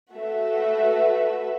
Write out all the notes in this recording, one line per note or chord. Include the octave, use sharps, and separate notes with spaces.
A3 F#4 B4 E5